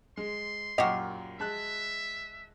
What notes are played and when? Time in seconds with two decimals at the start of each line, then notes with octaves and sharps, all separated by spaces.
0.17 G#3 C6
0.78 F#2 A#2 F#4 G4 D#5
1.40 G#3 E5 A5 F#6